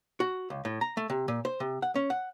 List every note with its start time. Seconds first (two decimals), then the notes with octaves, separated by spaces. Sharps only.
0.20 F#4
0.50 C#2
0.65 A2
0.81 A#5
0.97 A3
1.10 C3
1.28 A#2
1.45 C5
1.60 C3
1.82 F#5
1.95 C#4
2.10 F#5